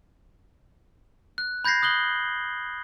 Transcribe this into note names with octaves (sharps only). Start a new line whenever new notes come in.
F#6
B5 G6 G#6 A#6 C7
D#6 F#6 F#7 G7